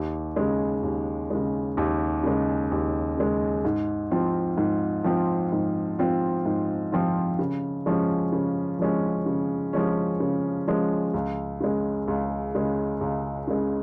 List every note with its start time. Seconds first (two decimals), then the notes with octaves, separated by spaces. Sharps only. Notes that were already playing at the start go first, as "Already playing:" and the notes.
Already playing: D#2
0.36 C#3 G#3
0.83 D#2
1.30 C#3 G#3
1.77 D#2
2.24 C#3 G#3
2.71 D#2
3.17 C#3 G#3
3.65 G#2
4.11 F3 C4 F4
4.58 G#2
5.04 F3 C4 F4
5.52 G#2
5.99 F3 C4 F4
6.46 G#2
6.92 F3 C4 F4
7.39 C#3
7.86 F3 G#3 C#4
8.32 C#3
8.79 F3 G#3 C#4
9.26 C#3
9.73 F3 G#3 C#4
10.20 C#3
10.67 F3 G#3 C#4
11.14 C#2
11.61 C#3 G#3
12.08 C#2
12.55 C#3 G#3
13.01 C#2
13.48 C#3 G#3